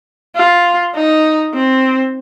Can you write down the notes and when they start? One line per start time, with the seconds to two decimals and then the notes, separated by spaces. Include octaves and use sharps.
0.36 F4
0.95 D#4
1.54 C4